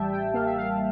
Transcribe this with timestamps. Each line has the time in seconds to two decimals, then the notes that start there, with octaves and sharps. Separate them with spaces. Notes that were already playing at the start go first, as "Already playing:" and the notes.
Already playing: A1 G3 E5 G5 A5
0.12 G5
0.34 A#3 F5
0.46 E5
0.58 F5